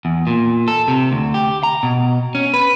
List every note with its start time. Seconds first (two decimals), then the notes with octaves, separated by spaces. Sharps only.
0.05 E2
0.27 A#2
0.68 A4
0.88 C3
1.12 D2
1.34 G4
1.63 A#5
1.83 B2
2.35 C#4
2.54 B4